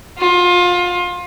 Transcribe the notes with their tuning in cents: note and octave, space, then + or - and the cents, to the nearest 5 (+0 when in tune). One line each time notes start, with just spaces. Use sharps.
F4 +25